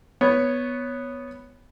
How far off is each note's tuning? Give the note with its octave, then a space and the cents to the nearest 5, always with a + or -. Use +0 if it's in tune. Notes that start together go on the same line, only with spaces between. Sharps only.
B3 +0 C#5 +0